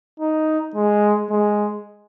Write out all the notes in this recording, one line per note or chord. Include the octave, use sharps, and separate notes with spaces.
D#4
G#3
G#3